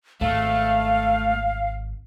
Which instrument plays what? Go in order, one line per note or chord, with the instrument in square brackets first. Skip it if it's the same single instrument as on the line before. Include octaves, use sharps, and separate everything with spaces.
[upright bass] G#1 [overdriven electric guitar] A3 [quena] F5